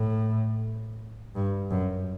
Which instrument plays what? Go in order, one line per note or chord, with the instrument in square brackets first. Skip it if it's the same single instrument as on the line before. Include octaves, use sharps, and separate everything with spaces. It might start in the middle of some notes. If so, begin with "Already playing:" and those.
Already playing: [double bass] A2
G2
F#2